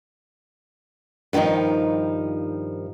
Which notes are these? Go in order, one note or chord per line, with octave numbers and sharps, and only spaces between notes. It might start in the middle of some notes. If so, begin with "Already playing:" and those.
G2 D3 D#3 F3 D#4